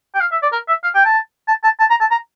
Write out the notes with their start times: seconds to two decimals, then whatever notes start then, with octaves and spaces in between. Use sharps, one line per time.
0.15 G5
0.21 F5
0.32 E5
0.42 D5
0.52 A#4
0.68 E5
0.84 F5
0.95 G5
1.05 A5
1.48 A5
1.64 A5
1.80 A5
1.90 A#5
2.01 A5
2.11 A#5